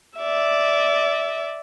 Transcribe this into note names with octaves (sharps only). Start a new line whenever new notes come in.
D5 E5